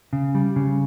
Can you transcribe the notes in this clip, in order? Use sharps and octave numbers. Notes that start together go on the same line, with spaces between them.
C#3
G3
C#3